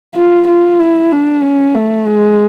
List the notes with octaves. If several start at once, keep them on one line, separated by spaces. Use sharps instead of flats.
F4
F4
E4
D4
C#4
A3
G#3